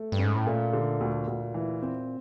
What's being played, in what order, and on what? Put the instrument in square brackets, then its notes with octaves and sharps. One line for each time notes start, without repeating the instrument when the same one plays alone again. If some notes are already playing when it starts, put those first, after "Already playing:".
Already playing: [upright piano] A3
[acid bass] G2
[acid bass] G#2 [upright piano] C#4
[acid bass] A2
[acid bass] A#2 [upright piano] A3
[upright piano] D3
D2
D2
E3
C4